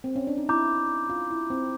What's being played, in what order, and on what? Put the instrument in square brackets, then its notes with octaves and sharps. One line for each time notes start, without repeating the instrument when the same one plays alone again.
[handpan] C4
C#4
D4
D#4
[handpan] E4 [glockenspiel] A#5 D6 G6
[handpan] F4
E4
C4